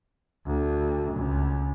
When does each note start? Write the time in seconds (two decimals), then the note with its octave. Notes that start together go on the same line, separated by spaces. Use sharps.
0.47 D2
1.14 C#2